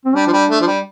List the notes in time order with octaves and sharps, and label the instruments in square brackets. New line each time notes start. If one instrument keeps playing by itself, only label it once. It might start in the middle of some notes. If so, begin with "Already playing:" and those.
[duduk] C4
[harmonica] G3 [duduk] D4
[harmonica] F3
G3
A3
F3
G3